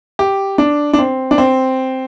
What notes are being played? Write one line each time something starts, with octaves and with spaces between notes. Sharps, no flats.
G4
D4
D4
C4
D4
C4